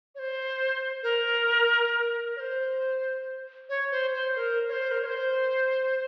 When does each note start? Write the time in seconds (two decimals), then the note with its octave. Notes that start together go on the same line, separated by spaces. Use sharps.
0.15 C#5
0.19 C5
1.03 A#4
2.36 C#5
2.39 C5
3.69 C#5
3.91 C5
4.13 C5
4.36 A#4
4.68 C#5
4.72 C5
4.91 A#4
5.02 C#5
5.06 C5